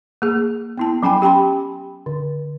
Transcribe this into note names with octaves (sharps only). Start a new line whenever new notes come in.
A#3 G#4
B3 E4 A5
F#3 C#4 G5 G#5 B5
G4 G5 A5 B5 C6
D3